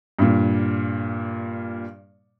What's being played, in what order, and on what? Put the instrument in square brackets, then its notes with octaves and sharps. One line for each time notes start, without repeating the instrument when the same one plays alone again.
[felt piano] G2 A#2